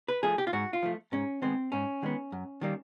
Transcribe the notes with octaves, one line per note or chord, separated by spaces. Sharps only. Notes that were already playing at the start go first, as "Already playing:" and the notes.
B4
F3 A3 G#4
G4
F4
G#2 F#4
F4
F3 A3
G#2 C#4
D#3 G#3 B3 C4
G#2 C#4
D#3 G#3 B3
F#2
D#3 G3 A#3